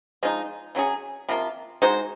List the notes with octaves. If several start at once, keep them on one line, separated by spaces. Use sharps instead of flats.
F3 G#3 D#4
C#3 F#3 C#4 G#4
C3 F3 A#3 F4
G#3 D#4 F#4 C5